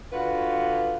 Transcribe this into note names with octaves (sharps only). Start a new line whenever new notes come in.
D3 F4 F#4 B4